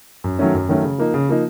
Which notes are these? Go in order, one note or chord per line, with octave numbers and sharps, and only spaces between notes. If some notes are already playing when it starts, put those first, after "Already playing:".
F#2
D#3 F#3 A3 C#4
F#2
D#3 F#3 A3 C#4
C#3
F3 A#3 D#4
C#3
F3 A#3 D#4